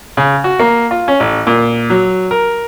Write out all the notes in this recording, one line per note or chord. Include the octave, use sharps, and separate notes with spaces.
C#3
F#4
A#3
F4
C#4
A1
A#2
F#3
A#4